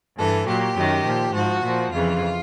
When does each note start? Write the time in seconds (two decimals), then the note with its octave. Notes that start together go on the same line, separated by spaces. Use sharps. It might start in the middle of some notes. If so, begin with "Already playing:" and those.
0.18 G2 E3 A4
0.47 A#2 F#3 G4
0.76 F#2 D#3 F#3
1.05 A#2 F3
1.34 G#2 F3 F#4
1.64 A#2 F3
1.92 F2 C#3 E3 F4